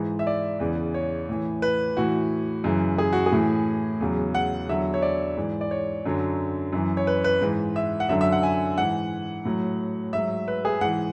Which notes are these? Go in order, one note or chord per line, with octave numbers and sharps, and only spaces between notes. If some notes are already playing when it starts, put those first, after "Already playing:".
Already playing: G#2 E3
E5
D5
E2 C#3 E3
C#5
A2 E3
B4
A2 E3 F#4
F#2 C#3 E3
G#4
F#4
G#4
A2 E3
E2 C#3 F#3
F#5
E2 D3 F#3 E5
C#5
D5
G#2 E3
D5
C#5
F#2 D3 F#3
F#2 E3
C#5
B4
B4
G#2 E3
E5
F#5
F#2 D3 F#3 E5
E5
F#5
G#5
G#2 E3 F#5
A2 F#3
G#2 F#3 E5
B4
G#4
G#2 E3 F#5